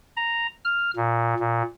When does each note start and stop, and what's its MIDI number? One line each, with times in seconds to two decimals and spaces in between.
0.16 0.47 82
0.65 0.91 89
0.96 1.34 46
1.39 1.62 46